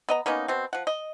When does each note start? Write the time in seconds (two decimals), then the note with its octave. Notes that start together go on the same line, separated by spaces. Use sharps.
0.09 B3 D#5 A#5
0.26 A#3 B3 C#4 D#4
0.48 B2 C4
0.73 F3 F#5
0.87 D#5